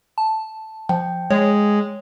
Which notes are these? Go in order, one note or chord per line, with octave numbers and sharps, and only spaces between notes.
A5
F3 G5
G#3 C#5